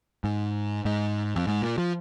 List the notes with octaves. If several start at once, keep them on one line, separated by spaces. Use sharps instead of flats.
G#2
G#2
F2
G#2
A#2
F3